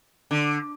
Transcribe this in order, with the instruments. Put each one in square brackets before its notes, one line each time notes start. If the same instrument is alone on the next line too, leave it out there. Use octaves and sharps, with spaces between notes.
[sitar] D3